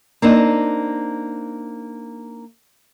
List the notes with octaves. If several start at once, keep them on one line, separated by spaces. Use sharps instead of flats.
A#3 C4 D4 D#4